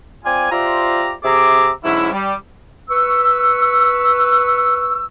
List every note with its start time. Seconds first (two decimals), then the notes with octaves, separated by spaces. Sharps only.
0.25 C4 F4 D5 G#5
0.52 F4 G4 C5 D5 E5 A#5
1.23 C3 G#4 E5 A#5 D6
1.84 G#2 D3 F#3 C#4 E4
2.13 G3
2.90 B4 C#6 E6